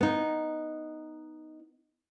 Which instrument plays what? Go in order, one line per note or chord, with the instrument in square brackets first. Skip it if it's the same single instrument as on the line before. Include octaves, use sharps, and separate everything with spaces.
[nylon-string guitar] B3 D#4